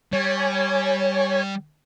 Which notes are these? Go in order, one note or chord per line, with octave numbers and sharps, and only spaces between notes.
G3 C#5 G#5